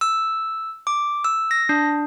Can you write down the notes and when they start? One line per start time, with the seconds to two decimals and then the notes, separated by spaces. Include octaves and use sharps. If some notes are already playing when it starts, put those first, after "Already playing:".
0.01 E6
0.87 D6
1.24 E6
1.51 A#6
1.69 D4